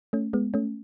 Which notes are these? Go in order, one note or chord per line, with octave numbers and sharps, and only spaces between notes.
A3 C#4
G#3 B3
A3 C#4